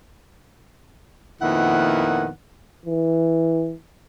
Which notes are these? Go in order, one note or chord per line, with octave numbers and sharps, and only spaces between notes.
F2 A#2 D#3 B3 E4 F#5
E3